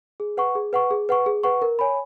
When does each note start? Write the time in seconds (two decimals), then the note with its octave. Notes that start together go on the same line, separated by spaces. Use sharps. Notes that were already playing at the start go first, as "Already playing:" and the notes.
0.20 G#4
0.37 B4 F#5 C#6
0.55 G#4
0.73 B4 F#5 C#6
0.91 G#4
1.09 B4 F#5 C#6
1.26 G#4
1.43 B4 F#5 C#6
1.62 A#4
1.79 C#5 G#5 B5